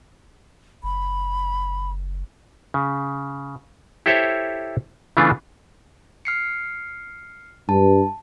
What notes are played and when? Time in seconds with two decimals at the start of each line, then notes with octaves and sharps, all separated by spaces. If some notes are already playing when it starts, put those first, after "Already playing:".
0.84 F#1 B5
2.74 C#3
4.06 E4 G4 A4 C5 C#5 E5
5.17 C#3 E3 A3 B3 D4 F4
6.25 F6 C7 C#7
7.69 G2 A5